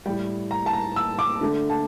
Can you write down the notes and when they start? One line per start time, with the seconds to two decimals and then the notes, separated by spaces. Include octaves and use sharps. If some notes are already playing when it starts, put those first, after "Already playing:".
0.06 G3 G5
0.09 A2
0.51 A#5
0.66 A5
0.73 A#5
0.96 E6
1.19 D6
1.41 D3 A3
1.70 A5